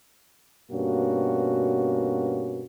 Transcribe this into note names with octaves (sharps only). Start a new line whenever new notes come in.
G2 B2 A#3 C#4 F#4